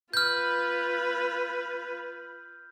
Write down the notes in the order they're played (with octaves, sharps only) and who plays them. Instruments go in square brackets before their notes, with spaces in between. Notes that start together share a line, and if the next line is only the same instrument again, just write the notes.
[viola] F4 B4 [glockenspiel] F6 G6